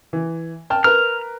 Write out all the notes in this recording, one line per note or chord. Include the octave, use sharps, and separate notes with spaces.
E3
G5 A5 F6
A#4 B4 F6